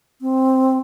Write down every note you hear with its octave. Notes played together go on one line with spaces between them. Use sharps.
C4